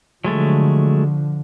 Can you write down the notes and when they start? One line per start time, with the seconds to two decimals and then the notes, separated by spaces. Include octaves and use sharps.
0.24 D3 F3 F#3 G#3 A3